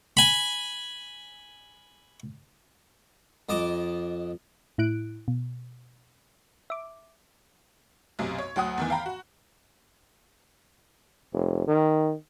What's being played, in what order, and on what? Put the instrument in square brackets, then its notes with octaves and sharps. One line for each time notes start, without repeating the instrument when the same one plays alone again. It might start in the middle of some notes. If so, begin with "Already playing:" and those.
[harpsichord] G#5 B5
F2 D#5 A5 D6
[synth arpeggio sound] A2 E4 F#6 D7
B2
E5 D6
[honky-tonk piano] B1 F#2 C3
C#5
D2 F#3 F#5 D#6
E2 D#3 E3
F5 G5 A#5 B5
F#4
[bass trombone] F1
D#3